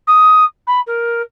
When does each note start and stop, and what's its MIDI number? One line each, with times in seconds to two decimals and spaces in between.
0.07 0.44 87
0.67 0.80 83
0.87 1.22 70